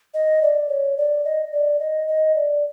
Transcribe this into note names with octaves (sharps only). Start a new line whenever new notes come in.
D#5
D5
C#5
D5
D#5
D5
D#5
D#5
D5